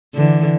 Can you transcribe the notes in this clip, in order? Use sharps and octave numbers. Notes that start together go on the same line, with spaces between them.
D3 E3